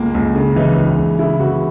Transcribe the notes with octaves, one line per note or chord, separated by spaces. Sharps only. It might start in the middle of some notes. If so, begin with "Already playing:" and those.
Already playing: C#2 A#3
C#2
C#3
E3 D#4
C#2
C#2
C#3 E4
E3 F#4